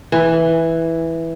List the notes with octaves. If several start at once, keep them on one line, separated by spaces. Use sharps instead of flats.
E3